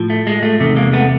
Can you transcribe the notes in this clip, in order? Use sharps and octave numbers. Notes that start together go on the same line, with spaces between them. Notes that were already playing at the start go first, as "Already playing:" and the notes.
Already playing: A2 F3
A3
G#3
A3
E2 C3 D#3 A3
G#3 A#3
A3 B3